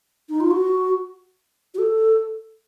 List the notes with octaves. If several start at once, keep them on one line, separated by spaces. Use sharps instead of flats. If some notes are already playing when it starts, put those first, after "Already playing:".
D#4
F4
F#4
F#4
A4